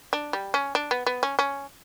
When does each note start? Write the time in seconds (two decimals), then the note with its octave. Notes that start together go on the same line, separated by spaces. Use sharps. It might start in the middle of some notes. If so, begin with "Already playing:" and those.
0.13 D4
0.33 G3
0.54 C#4
0.75 D4
0.91 B3
1.06 B3
1.23 C#4
1.39 C#4